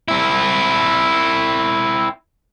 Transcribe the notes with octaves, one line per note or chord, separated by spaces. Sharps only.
C4 E4